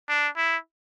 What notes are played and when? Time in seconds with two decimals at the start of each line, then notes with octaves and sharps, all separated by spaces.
0.09 D4
0.37 E4